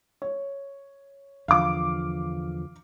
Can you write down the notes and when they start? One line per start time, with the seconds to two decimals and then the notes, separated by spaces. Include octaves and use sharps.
0.22 C#5
1.48 E2 D3 F3 F5 D6